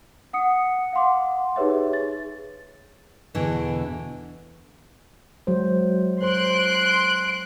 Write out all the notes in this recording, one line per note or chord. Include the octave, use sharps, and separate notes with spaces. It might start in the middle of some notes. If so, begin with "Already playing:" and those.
F#5 D#6 C#7
F5 F#5 C6 D6
D#4 G4 G#4 B4 C#5 E5
G#4 A6
E2 B2 D3 E3
F#3 G#3 C5
C5 C6 F#6 D7